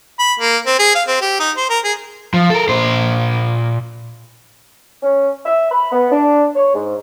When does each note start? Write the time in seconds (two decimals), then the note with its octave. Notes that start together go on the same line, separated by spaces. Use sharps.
0.19 B5
0.40 A#3
0.66 C4
0.79 G#4
0.95 F5
1.07 C4
1.21 G4
1.40 D#4
1.57 C5
1.70 A#4
1.84 G#4
2.34 F3
2.50 A4 A#4
2.69 A#2 C5
5.03 C#4
5.45 E5
5.71 B5
5.92 B3
6.10 D4
6.55 C#5
6.74 G#2